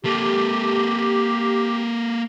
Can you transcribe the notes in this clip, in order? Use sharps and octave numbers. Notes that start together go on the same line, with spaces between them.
A#3 G4 A4